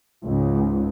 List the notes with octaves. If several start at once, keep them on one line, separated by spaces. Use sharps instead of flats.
C#2 G#2